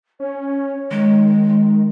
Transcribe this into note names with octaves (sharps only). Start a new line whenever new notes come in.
C#4 C#5
D#3 G#3